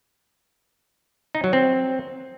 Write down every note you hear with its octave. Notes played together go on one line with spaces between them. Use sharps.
D#4
F#3
C4